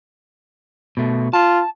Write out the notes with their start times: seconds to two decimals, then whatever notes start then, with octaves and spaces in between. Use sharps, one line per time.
0.97 B2 A3
1.33 F4 A5